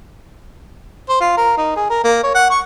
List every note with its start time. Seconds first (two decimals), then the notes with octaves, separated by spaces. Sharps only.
1.09 C5
1.21 F4
1.37 A#4
1.58 D#4
1.76 G#4
1.90 A#4
2.04 A#3
2.24 C#5
2.35 F#5
2.51 C#6